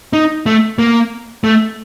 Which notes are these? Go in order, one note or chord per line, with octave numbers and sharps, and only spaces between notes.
D#4
A3
A#3
A3